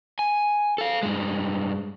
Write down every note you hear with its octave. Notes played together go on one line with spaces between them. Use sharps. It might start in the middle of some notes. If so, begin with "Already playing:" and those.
G#5
A4 F5
G2 G#3